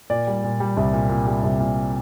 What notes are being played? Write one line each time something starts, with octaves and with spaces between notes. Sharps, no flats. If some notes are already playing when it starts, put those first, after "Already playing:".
A#2 D5
G3
A#2
G3
C2
A#2
A#2
G3
C2
A#2